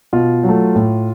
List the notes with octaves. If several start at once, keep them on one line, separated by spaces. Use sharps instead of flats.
B2 F4
F#3
A3
A2